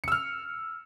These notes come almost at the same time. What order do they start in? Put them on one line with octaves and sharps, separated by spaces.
C#7 E6 F6